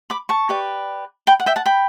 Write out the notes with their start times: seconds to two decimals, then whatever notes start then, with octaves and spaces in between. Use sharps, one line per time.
0.10 B5 D6
0.29 A5 C#6
0.49 G4 B4 D5
1.27 G5 B5
1.40 F#5
1.46 E5 G5
1.56 F#5 A5
1.66 G5 B5